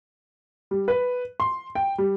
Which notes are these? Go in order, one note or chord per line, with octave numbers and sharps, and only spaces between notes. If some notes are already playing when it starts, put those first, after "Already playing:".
G3
B4
C6
G5
G3